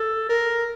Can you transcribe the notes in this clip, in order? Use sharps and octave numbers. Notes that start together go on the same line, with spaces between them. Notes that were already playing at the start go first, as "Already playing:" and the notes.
Already playing: A4
A#4